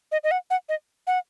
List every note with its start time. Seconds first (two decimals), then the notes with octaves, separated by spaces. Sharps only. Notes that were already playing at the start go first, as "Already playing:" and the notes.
0.12 D#5
0.24 D#5
0.31 F#5
0.50 F#5
0.69 D#5
1.07 F#5